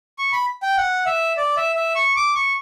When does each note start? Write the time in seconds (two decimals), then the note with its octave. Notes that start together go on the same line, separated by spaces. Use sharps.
0.18 C#6
0.32 B5
0.62 G5
0.77 F#5
1.06 E5
1.37 D5
1.57 E5
1.76 E5
1.95 C#6
2.16 D6
2.35 C#6